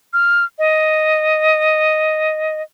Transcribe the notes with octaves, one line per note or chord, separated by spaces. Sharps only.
F6
D#5